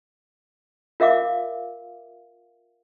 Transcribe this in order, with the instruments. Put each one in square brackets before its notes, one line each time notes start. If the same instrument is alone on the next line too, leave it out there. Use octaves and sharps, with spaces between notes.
[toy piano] F4 A#4 E5 F5 D6